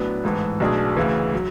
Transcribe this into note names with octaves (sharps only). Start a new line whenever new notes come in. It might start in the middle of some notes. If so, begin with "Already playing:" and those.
Already playing: A2 F#3 B3 D4
A1 G#2 E3 A3
B1 B2 A3 D4 G#4
D2 C#3 E3
F#3